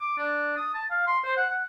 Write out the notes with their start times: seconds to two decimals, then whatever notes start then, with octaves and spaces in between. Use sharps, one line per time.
0.01 D6
0.18 D4
0.56 D#6
0.74 A5
0.90 F5
1.07 C6
1.24 C5
1.37 F#5
1.50 F#5